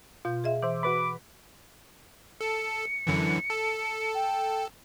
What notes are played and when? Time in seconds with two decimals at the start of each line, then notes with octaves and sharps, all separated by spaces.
0.25 B2 F4 G6
0.44 G#4 D#5 E5
0.62 E3 C5 E5 D6
0.83 F#4 B4 B5 D6
2.41 A4 C#7
3.07 F#2 D3 E3
3.50 A4
4.14 G5